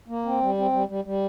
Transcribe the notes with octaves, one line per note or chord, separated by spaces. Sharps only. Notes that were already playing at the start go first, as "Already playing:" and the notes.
A#3
C4
G3
C4
G3
G3
G3